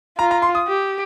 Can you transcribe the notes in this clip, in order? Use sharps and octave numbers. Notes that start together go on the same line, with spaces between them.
F4 A#5
A#5
C6
D#6
G4